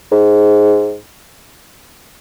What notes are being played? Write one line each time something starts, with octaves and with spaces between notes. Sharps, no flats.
G#2